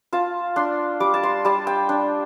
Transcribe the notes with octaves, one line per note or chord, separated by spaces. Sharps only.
F4 A5
D4 C6
G3 D6
A5
C6
G3 A5
G5
D4